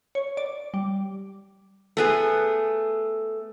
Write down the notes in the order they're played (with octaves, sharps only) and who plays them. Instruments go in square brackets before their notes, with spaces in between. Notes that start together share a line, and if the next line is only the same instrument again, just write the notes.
[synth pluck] C#5
D5
G3
[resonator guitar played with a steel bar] A3 B3 G#4